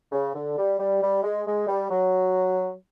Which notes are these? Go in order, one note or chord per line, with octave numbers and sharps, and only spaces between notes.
C#3
D3
G3
G3
G3
G#3
G#3
G3
F#3